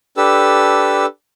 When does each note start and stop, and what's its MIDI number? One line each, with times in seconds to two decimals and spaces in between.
0.17 1.06 62
0.17 1.06 67
0.17 1.06 69
0.17 1.06 71
0.17 1.06 88